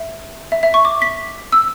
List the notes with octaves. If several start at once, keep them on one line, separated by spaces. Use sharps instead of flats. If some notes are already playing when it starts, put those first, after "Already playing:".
Already playing: E5
E5
E5
C#6
D6
B6
E6